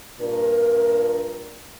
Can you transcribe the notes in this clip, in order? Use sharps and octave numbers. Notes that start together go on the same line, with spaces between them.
G2 A#2 D4 A#4